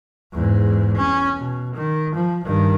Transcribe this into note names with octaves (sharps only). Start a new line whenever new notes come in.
E2 G#2
C#4
B2
D#3
F3
G2 D#3